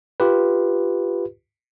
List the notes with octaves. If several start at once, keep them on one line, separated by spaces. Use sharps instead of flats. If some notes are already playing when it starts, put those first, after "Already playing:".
F4 G4 B4